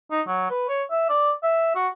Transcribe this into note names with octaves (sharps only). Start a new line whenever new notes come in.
D#4
F#3
B4
C#5
E5
D5
E5
F#4